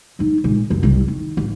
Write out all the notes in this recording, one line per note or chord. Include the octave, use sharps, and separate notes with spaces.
F#3 D#4
A#2 G#3
F#2 A#2
C2 G3
D#3
A1